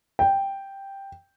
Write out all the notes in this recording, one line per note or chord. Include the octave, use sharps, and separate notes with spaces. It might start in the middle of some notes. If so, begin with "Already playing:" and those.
G5